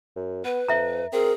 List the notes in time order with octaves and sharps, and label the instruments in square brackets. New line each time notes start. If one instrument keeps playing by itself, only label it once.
[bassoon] F#2
[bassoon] B3 [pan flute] B4
[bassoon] F2 [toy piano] E5 A#5
[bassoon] C4 [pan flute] G#4 [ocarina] A#4